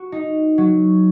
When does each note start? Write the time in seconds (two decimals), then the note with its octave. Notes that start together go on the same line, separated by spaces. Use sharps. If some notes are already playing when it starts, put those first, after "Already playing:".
Already playing: F#4
0.12 D#4
0.58 F#3